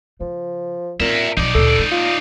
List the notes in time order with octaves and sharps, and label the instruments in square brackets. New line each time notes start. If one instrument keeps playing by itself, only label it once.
[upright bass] C#3 [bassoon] F3
[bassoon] A#2 [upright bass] C4 D#4 [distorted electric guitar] A#4 E5
[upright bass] D#1 B1 [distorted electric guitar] D#4 D5
[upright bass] D2 A#2 [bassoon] A4
[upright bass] A#3
[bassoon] F4